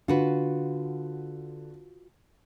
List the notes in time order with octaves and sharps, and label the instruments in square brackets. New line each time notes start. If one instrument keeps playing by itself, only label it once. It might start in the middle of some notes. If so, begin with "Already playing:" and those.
[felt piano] D3 [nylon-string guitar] F4 F#4 B4